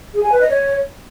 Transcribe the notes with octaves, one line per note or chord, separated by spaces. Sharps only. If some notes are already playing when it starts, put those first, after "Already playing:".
G#4
G#5
B4
D#5
C#5